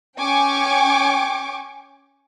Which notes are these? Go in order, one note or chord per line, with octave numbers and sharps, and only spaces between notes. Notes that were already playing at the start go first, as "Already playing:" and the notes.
C#4 G5 G#5 C#6 D6